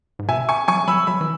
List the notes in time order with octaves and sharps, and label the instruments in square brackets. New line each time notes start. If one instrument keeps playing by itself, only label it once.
[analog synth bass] G#2
[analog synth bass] B2 [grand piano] E5 G#5
[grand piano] G#5 C#6
[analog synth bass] F#3 [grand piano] G#5 C#6
[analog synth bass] F#3 [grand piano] B5 E6
[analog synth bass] F#3 [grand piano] B5 E6
[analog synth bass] E3